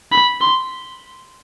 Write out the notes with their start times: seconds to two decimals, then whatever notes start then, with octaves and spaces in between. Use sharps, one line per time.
0.12 B5
0.41 C6